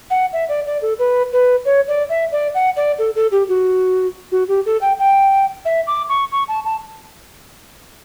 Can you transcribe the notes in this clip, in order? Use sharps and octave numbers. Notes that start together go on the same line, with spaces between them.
F#5
E5
D5
D5
A4
B4
B4
C#5
D5
E5
D5
F#5
D5
A4
A4
G4
F#4
F#4
G4
A4
G5
G5
E5
D6
C#6
C#6
A5
A5